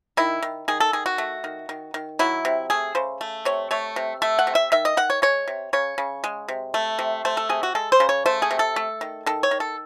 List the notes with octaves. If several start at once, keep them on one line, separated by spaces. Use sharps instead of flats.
D#3 E4
D#3
D#3 G#4
A4
D#3 G#4
F#4
A3
D#3
D#3
D#3
F#3 E4
C3
A3 G#4
C#3 C5
A3
C3 C#5
A3 C#5
C3
A3 E5
F#5
C3
E5
D#3 E5
D#5
D#3 F#5
C#5
G#3 C#5
C3
C#3 C#5
C#3
G#3
C3
A3
C3
A3 C5
A4
C3 G#4
F#4
G#3 A4
C5
C#3
C#5
A3 C5
G#4
C3
A4
A3
D#3
D#3 A4
C#5
D#3
A4